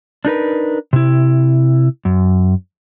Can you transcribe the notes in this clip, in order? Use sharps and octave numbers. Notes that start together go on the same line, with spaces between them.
D4 D#4 A#4 B4
C3 E4
F#2